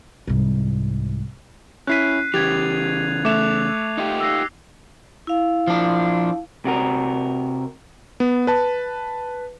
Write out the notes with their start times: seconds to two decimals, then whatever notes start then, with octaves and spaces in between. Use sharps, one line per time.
0.27 C2 G#2
1.87 C#4 E4 F#6 B6 C7 D#7
2.34 C#3 E3 G4 G#6 A6 F7
3.25 A3 E5 D6 F#6 E7 F7
3.97 D#4 F4 G4
4.20 E6 A#6 C7
5.27 E4 F5
5.67 F3 D4
6.65 C3 F#4 A#4
8.20 B3
8.47 B4 A5